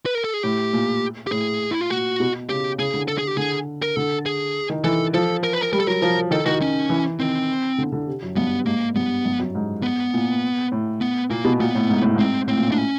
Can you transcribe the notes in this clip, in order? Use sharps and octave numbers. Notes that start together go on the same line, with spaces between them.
B4
A#4
A4
G#4
A2 G4
A#2
G4
A2 G#4
E4
F4
A#2 F#4
B2
C#3 G4
C#3 G#4
D3
A4
G#4
G4
D3 G#4
A#4
D3 A4
G#4
D#3
E3 A4
F3 A4
A#4
B4
A#4
G3 A#4
A4
F#3 A#4
F3
D#3 A4
D#3 F#4
C#4
E3
D#3 C4
D3
D3
C3
F#2
G2 B3
G#2 A#3
G2 B3
G2
F#2
G#2
B3
A#2
A2
B3
A#2 A#3
B2
A#2 B3
A2
G#2
A2
G#2 C4
A2 C4
A#2
A2
D4
C#4